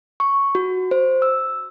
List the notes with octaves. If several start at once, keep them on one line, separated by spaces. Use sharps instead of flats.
C#6
F#4
C5
E6